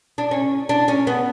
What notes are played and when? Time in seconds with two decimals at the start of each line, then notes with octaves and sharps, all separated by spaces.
0.18 D4
0.31 C#4
0.69 D4
0.88 C#4
1.07 B3